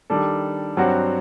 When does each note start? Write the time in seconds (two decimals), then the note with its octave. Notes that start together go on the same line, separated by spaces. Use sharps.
0.10 D#3 G3 D4 A4
0.77 G2 F#3 C4 F#4